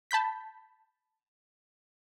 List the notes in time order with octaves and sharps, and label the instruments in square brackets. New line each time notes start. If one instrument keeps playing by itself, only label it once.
[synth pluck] A5 B5 G6 B6